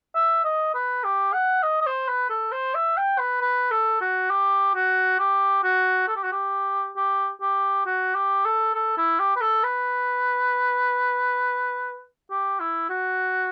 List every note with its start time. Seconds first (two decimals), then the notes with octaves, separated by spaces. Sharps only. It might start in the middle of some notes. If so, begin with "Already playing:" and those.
0.15 E5
0.44 D#5
0.74 B4
1.04 G4
1.33 F#5
1.63 D#5
1.82 D#5
1.86 C5
2.09 B4
2.30 A4
2.52 C5
2.74 E5
2.97 G5
3.19 B4
3.41 B4
3.71 A4
4.01 F#4
4.31 G4
4.75 F#4
5.19 G4
5.63 F#4
6.08 A4
6.16 G4
6.24 F#4
6.32 G4
6.96 G4
7.41 G4
7.86 F#4
8.15 G4
8.45 A4
8.74 A4
8.97 E4
9.19 G4
9.36 B4
9.41 A4
9.63 B4
12.30 G4
12.60 E4
12.90 F#4